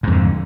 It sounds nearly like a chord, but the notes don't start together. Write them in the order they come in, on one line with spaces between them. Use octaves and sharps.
G#2 F2 D3